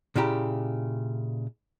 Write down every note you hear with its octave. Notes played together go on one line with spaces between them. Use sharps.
A#2 C#3 E4 G4 A#5